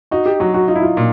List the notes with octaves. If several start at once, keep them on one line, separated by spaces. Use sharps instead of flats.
D#4 F#4
G4
F#3 F#4
F#4
D#4 F4
E4
F4
A#2